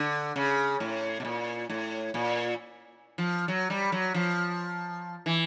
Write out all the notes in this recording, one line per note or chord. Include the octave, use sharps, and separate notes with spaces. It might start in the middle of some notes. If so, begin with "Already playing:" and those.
Already playing: D3
C#3
A2
B2
A#2
A2
A#2
F3
F#3
G3
F#3
F3
E3